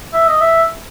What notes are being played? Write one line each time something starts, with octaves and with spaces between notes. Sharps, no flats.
E5
D#5
E5